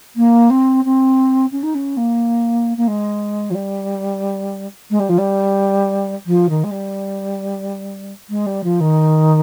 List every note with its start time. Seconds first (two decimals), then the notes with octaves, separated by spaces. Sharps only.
0.16 A#3
0.50 C4
0.85 C4
1.51 C#4
1.63 D#4
1.74 C#4
1.97 A#3
2.77 A#3
2.87 G#3
3.50 F3
3.54 G3
4.90 G#3
4.99 G3
5.09 F3
5.18 G3
6.26 F3
6.49 D#3
6.64 G#3
6.71 G3
8.29 G#3
8.46 G3
8.64 F3
8.80 D#3